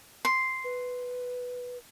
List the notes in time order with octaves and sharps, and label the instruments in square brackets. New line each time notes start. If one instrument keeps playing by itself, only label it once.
[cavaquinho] C6
[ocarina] B4